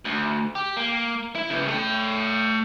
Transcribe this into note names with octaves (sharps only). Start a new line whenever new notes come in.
D2
G4
A#3
E4
C#3 B3
A3 G5